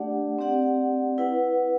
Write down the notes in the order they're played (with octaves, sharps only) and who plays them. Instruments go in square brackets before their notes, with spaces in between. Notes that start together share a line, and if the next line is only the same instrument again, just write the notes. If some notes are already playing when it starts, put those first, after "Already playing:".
Already playing: [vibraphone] A3 D4 G4 D5 F#5
C4 G4 D5 F#5
E4 B4 F#5